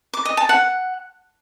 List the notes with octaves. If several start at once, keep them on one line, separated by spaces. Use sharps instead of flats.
D6
D#5
A5
F#5